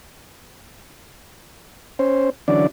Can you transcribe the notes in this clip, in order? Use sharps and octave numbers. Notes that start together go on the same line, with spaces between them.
C#4 C5
D3 E3 F#3 C#4 D4 D5